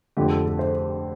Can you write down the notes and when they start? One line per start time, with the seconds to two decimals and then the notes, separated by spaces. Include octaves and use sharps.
0.17 F1 F2 D3 G4
0.31 A4
0.45 A4
0.59 C5